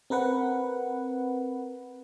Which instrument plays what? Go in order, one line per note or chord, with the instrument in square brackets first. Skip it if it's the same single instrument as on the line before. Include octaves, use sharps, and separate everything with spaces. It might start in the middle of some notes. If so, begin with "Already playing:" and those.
[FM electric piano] C4 A#4 B4 F#5